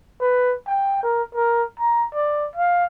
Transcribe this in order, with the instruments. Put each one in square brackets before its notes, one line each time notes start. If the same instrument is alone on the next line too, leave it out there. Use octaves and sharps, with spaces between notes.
[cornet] B4
G5
A#4
A#4
A#5
D5
F5